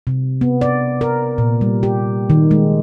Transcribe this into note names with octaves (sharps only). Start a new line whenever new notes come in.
C3
B3
D5
A#4
A#2
G3
G4
D#3
G#3